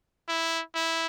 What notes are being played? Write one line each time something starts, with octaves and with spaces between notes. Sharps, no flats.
E4
E4